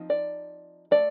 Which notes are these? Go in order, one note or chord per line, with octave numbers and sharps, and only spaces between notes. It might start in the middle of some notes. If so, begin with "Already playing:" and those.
Already playing: F3 C4 D#4
D5
A3 D5